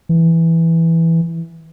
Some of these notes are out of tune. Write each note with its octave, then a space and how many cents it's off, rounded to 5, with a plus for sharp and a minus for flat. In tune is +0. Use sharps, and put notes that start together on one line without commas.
E3 +0